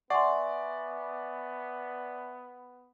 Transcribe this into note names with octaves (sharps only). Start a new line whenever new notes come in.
B3 D5 E5 F#5 G#5 C6 C#6